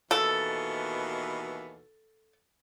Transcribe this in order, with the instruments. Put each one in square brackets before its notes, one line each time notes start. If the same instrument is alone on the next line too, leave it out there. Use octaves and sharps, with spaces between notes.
[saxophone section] D#2 B2 E3 [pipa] A4